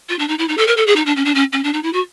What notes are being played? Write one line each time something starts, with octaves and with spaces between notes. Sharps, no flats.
F4
D4
D#4
E4
D#4
A4
A#4
A4
G#4
D#4
D4
C#4
D4
C#4
C#4
D4
D#4
E4
F#4